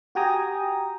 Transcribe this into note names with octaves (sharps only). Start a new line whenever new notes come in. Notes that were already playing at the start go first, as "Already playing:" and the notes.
F#4 G4 G5 G#5 A#5 D#6